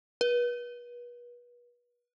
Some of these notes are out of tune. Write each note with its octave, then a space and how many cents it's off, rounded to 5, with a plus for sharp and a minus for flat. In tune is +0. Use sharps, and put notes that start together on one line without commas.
B4 -35